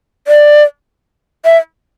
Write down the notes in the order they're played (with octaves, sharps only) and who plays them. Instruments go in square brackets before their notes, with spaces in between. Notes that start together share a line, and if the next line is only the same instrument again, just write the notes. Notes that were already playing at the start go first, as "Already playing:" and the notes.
[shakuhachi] D5
E5